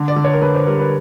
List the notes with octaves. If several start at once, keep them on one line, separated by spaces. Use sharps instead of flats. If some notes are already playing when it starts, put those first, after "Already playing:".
Already playing: D3
D5
D3
C#5
A#4
D3 B4
C5
G3 A#4
B4